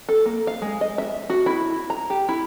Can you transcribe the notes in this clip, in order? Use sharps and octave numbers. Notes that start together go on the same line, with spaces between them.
A4
A#3
F5
G#3
D#5
E5
F#4
E4
A#5
G4
E4